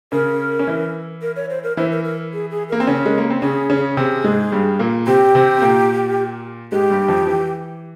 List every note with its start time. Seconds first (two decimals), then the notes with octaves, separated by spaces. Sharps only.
0.12 C#3 C#4 A#4
0.59 C#4
0.67 E3 E4
1.22 A#4
1.36 C#5
1.50 C5
1.64 A#4
1.77 E3 E4 C5
1.92 A#4
2.04 A#4
2.33 G#4
2.51 G#4
2.69 A#3 A#4
2.80 C4
2.87 C#3 C#4
3.06 G#3
3.18 A#3
3.30 C4
3.42 C#3 C#4 G#4
3.70 C#3 C#4
3.97 C3 C4 G#4
4.24 G#2 G#3
4.52 G2 G3
4.79 A#2 A#3
5.07 C3 C4 G4
5.35 C3 C4
5.58 C4
5.62 A#2 A#3
6.72 G#2 G#3 G4
6.90 G2 G3
7.08 F2 F3
7.27 E3